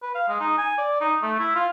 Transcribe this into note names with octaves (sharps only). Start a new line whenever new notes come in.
B4
F5
G#3
D#4
G#5
D5
D#4
A3
E4
F4